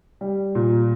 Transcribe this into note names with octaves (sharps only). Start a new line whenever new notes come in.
G3
A#2